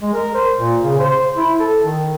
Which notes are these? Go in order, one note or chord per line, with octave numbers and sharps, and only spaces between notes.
G#3
A#4
C5
A#2
C#3
C5
E4
A4
D#3